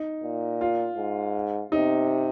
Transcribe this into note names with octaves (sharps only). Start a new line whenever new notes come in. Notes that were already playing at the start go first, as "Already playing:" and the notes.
Already playing: D#4
A#2
F4
G#2
C3 D#4